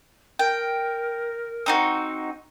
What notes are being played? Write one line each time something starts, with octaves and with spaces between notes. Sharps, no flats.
A#4 G5
C4 D#4 F#4